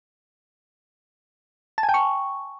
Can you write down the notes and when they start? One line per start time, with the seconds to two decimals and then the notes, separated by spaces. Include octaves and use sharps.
1.78 A5
1.83 G#5
1.89 G5
1.94 C#6